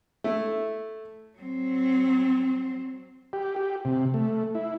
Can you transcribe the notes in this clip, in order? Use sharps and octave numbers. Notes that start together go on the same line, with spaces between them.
A3 E4
F#3 C4
G4
G4
C3
A3
E4